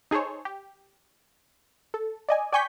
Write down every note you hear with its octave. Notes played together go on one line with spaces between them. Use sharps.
D#4 G#4 A4 C5 C#5
G4
A4
D5 D#5 G#5
D5 G5 G#5 C#6 G6 B6